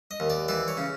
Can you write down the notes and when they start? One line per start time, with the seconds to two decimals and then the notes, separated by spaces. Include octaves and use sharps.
0.11 D#5
0.20 D#2
0.30 D5
0.48 E3 D5
0.68 C#5
0.77 C#3